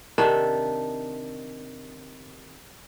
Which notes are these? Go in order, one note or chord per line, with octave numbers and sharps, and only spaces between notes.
C3 D#3 D4 E5